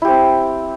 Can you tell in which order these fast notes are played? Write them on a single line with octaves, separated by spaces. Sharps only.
E4 G4 C4